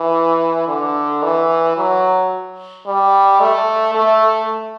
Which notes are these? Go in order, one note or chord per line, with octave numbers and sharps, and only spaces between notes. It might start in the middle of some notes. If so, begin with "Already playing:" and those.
Already playing: E3
D3
E3
F#3
G3
A3
A3